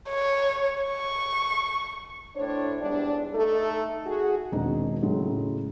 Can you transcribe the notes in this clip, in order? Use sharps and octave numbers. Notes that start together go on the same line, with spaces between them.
C#5
C#6
A2 D4 C5 C#5
E2 G#2 G3 D4
A3 D#4 A4
F#4 G#4
E1 D#3 C4 D4 D#4
A2 C#3 F#3 G#3